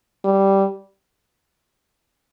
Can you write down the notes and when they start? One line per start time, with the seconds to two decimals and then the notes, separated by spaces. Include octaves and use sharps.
0.24 G3